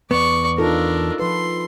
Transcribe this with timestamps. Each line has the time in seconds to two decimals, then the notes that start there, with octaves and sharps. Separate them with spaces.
0.11 E2 B3 D5 C#6
0.58 D4 D#4 F4 A4 A#4
1.19 F3 B4 C6